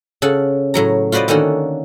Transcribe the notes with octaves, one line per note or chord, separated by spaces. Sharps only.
C#3 A4 F#5
A2 F#3 A#5
F4 F#4 B4 C5 D5 D#5
D3 D#3 A#3 C#4 F#4 A4